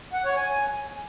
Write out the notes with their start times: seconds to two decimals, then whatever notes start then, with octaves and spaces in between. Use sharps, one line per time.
0.13 F#5
0.25 C#5
0.37 G#5